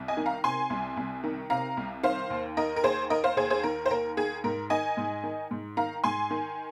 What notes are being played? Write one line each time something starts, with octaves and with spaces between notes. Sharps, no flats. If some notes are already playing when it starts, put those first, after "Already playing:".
Already playing: C2
D#5 G#5
D#3
F5 A#5
C3 G#5 C6
C2
C2
D#3
C3 F5 A#5
C2
D#3 C5 F5
D#2
D#3 A#4 D#5
A#4
D#2 G#4 C5
D#3 A#4 D#5
C5 F5
D#2 G#4 C5
G#4 C5
D#3 A#4
C5
D#2 A#4
D#3 G#4
G#2 A#4
D#3 D#5 G#5
G#2
D#3
G#2
D#3 F5 A#5
G#2 G#5 C6
D#3